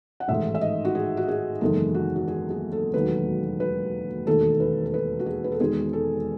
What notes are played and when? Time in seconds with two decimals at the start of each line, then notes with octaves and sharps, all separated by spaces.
0.20 F#5
0.28 A1 G#2 D#3 A3 E5
0.55 E5
0.61 D#5
0.85 F#4
0.95 G#4
1.17 F#4
1.28 G#4
1.61 F#1 E2 D#3 G#3 A4
1.94 F#4
2.16 F#4
2.28 G#4
2.50 G#4
2.72 A4
2.94 E1 D#2 D#3 F#3 A3 B4
3.60 B4
4.27 E1 D#2 D#3 A3 A4
4.60 B4
4.86 A4
4.94 B4
5.19 F#4
5.26 G#4
5.44 B4
5.52 A4
5.60 E1 E2 D#3 G#3 G#4
5.93 A4